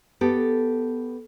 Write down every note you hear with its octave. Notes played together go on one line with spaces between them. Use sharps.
B3 G4 A4